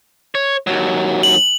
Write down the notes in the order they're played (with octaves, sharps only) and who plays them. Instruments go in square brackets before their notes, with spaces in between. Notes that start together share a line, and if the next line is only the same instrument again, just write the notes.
[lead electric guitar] C#5
D#2 F#3
[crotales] F#7